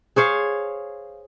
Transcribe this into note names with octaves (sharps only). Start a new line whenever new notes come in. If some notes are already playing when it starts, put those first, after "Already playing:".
G#4 C5 C#5 F5